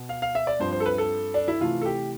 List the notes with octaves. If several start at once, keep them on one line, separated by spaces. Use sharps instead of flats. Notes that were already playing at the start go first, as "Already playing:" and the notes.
Already playing: B2
F5
F5
E5
D5
G2 F3 C4 C5
C5
A4
B4
A4
D4
E4
C3 E3 A3 F4
A4
G4